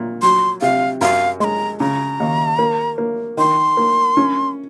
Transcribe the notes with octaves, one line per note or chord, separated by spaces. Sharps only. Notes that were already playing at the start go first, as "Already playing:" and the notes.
Already playing: A#2
F#3 C6
C3 F5
F#2 F5
G#3 A#5 C6
C#3 A#5
D#2
A#3
A#3
D#3 C6
A#3
C#4